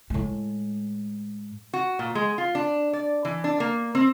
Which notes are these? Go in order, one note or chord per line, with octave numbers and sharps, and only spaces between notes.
A2 G#3
F#4
A#2
G#3
F4
D4
D5
E3
D4
A#3
C4